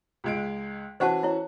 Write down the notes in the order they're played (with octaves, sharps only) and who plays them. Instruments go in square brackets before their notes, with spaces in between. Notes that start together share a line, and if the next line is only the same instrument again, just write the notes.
[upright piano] C#2 G#3 D7
[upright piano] E3 C#4 F#4 [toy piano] C5 F#5 A5
[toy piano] E4 C#5